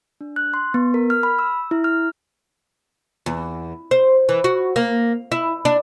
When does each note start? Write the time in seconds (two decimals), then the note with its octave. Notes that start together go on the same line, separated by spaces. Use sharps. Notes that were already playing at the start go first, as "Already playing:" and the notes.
0.21 D4
0.36 F#6
0.54 C6
0.74 B3
0.94 A#4
1.10 F6
1.23 B5
1.39 E6
1.71 E4
1.84 F6
3.26 E2
3.91 C5
4.29 E3
4.44 F#4
4.76 A#3
5.32 E4
5.65 D4